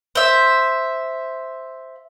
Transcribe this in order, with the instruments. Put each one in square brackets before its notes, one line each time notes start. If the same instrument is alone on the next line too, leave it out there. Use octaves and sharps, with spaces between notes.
[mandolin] C5 E5